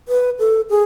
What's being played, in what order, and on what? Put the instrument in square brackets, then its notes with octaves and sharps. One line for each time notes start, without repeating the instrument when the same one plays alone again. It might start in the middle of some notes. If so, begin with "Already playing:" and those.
[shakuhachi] B4
A4
G#4